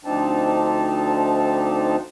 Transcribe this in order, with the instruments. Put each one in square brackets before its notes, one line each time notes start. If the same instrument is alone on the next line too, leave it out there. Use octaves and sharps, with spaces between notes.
[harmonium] D2 F3 C4 D4 D#4 A5